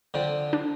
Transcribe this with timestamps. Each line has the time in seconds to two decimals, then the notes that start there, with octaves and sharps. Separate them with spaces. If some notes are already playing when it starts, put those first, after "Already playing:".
0.14 D3 F3 C4
0.53 D4